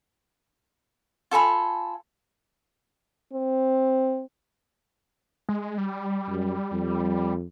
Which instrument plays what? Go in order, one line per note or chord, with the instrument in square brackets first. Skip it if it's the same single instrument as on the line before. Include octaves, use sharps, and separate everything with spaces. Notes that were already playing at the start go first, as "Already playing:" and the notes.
[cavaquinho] F4 A4 G#5 B5
[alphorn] C4
[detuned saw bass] G#3
G3
[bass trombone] F#2
F2